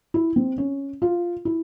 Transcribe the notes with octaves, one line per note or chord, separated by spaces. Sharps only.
E4
C4
C#4
F4
E4